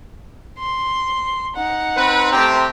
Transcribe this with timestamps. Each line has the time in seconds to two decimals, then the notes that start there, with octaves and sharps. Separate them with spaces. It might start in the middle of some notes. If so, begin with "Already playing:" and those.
0.59 C6
1.56 D#4 F#5
1.97 C4 B4
2.32 C3 A3 C4 G4 A#5